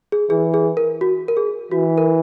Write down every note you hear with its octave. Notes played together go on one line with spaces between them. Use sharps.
G#4
E3 G#4
G#4
A#4
F#4
A#4
G#4
E3 F#4
A#4